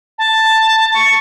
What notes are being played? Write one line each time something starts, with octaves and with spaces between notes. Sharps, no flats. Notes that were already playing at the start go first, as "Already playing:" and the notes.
A5
C#6